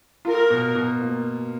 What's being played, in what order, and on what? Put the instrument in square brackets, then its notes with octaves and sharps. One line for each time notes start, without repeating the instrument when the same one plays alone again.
[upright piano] F4 [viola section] A#4
[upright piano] B2
B2
A#3